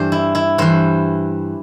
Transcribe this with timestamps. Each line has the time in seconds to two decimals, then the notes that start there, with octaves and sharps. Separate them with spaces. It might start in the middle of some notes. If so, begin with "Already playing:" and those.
Already playing: G2 E3 C5 D5
0.12 E4
0.35 E4
0.58 G2 E3 C5